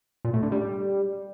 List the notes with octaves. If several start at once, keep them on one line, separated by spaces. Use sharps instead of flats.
A#2
A2
D3
G3